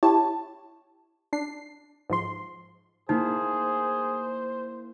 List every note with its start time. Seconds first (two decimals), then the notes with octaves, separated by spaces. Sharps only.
0.03 E4 G4 C#5 A5
1.33 D4 C7
2.10 G#2 F3 C6
3.09 A#3 D#4 E4 G#4 C5